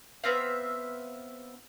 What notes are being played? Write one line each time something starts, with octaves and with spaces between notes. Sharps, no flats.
B3 C4 E5 F5